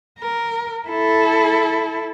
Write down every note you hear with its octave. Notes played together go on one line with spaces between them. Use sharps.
A#4
E4 A4